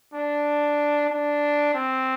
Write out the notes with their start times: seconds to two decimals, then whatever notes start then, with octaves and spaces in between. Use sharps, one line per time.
0.14 D4
1.10 D4
1.74 C4